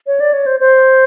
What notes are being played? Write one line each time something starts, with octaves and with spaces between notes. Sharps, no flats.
C#5
D5
C#5
C5
C5